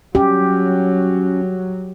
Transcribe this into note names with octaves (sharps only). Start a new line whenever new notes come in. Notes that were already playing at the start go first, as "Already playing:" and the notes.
F#3 C#4 G4